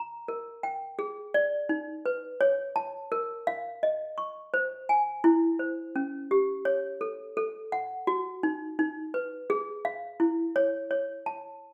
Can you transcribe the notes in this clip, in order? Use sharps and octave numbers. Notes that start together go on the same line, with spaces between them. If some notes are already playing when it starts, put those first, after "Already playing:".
Already playing: A#5
A#4
G5
G#4
D5
D#4
B4
C#5
A5
A#4
F5
D#5
C#6
C5
G#5
E4
C5
C#4
G4
C#5
A4
A4
F#5
F#4
D#4
D#4
B4
G#4
F5
E4
C#5
C#5
A5